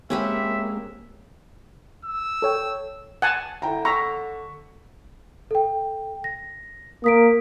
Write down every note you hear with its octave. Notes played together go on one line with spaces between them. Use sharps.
G#3 A#3 C4 C#4 G4 B4 E5
E6
A4 C#5 G5
F#5 G#5 A5
D3 E4 G5 A#5
A#5 C#6 E6 B6
A4 G5
A#6
A#3 D#6 B6 D7